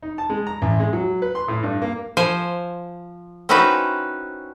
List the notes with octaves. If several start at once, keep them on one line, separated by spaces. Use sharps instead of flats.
D#4
A5
G#3
A#5
A1
G#3
F#3
B4
C6
A2
G2
A#3
F3 C5 G#5
C4 C#4 D#4 E4 F#4 B4